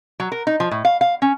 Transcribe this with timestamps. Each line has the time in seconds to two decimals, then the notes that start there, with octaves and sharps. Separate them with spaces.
0.20 F#3
0.32 A#4
0.47 D#4
0.60 F3
0.71 A2
0.85 F5
1.01 F5
1.22 C#4